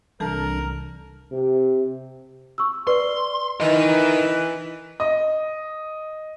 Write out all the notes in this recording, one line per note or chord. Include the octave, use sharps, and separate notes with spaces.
C2 E3 G3 C4 D4 A4 A#4 A5
C3
C#6 E6
B4 D5 C6
E3 D#4 A#4 D#5
D#5